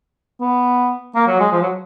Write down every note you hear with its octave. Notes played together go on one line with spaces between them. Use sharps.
B3
A#3
F#3
G#3
F3
F#3